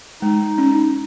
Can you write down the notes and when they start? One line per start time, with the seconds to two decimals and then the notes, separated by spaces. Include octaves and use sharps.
0.22 G#3 D#4
0.58 C#4